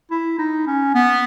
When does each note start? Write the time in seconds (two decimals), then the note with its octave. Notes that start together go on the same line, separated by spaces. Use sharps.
0.11 E4
0.39 D#4
0.67 C#4
0.95 B3